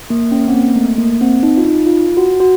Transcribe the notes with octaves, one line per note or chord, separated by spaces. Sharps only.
A#3
C#4
C4
A#3
A3
A#3
C4
D#4
F4
D#4
F4
F#4
F#4